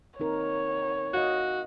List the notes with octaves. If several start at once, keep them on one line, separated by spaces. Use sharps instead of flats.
C4 D#4 A#4 C#5
F#4 D#5 F5